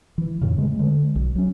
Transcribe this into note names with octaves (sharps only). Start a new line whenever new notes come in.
E3
F2 A2 C#3
C#3 G#3 A3
D3 G#3
B1
F#3 C#4